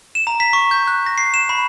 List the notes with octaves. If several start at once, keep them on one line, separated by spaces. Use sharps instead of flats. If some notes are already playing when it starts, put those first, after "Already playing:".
E7
A#5
B6
C#6
G6
F#6
A#6
C7
E7
B5